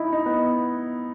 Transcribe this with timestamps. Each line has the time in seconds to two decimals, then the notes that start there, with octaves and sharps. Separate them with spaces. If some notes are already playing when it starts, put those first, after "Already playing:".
Already playing: D#4 E4
0.13 D#4
0.26 B3